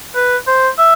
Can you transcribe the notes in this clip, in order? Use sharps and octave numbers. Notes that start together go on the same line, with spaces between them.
B4
C5
E5